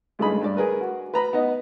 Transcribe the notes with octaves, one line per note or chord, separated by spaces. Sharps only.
C#2 G2 A3 D#4 G#4 B5
G2 D5
G#4 A#4 B4
F#4
B4 A#5 B5
B3 D#4 D#5